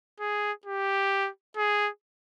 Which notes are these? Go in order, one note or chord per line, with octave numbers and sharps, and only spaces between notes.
G#4
G4
G#4